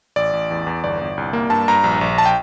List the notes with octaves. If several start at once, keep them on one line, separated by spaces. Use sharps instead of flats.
A1 D5
A1
E2
E2
G1 D5
G1
C2
A#3
G2 A5
G2 A#5
A#1
A#1
A5
G5